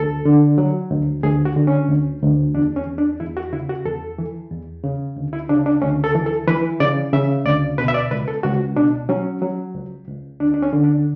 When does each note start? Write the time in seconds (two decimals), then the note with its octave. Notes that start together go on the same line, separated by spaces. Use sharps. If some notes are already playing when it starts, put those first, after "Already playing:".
Already playing: D2 A4
0.25 D3
0.58 F#3
0.91 D2
1.23 D2 G#4
1.45 F#4
1.56 D3
1.67 C#4
1.89 D2
2.22 D2
2.54 E2 D4
2.76 C#4
2.87 E2
2.98 D4
3.20 E2 E4
3.37 F#4
3.53 C#3 E4
3.69 F#4
3.86 E2 A4
4.18 E3
4.51 E2
4.84 C#3
5.16 D2
5.33 E4
5.49 C#3 D4
5.66 D4
5.82 D2 C#4
6.04 A4
6.15 E3
6.26 A4
6.47 E3 B4
6.80 C#3 D5
7.13 C#3 E5
7.46 D2 D5
7.78 B2 B4
7.88 E5
7.94 D5
8.11 C#2 B4
8.28 A4
8.43 C#2 F#4
8.76 B2 D4
9.09 F#3 C#4
9.42 F#3
9.75 C#2
10.08 C#2
10.40 D2 D4
10.54 D4
10.62 C#4
10.73 D3
10.84 D4